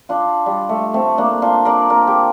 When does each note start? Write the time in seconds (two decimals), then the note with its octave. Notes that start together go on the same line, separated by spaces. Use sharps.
0.09 D4 F4
0.46 G3
0.69 A3
0.94 A3 C4
1.18 A#3 D4
1.42 D4 F4
1.65 A#4 D5
1.90 A#4 D5
2.07 G4 A#4